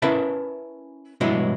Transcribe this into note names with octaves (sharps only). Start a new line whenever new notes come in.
C#4 E4 A#4 B4 E5 A5
G2 B2 E3 F#3 G#3 E4